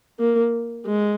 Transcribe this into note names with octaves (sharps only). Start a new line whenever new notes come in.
A#3
G#3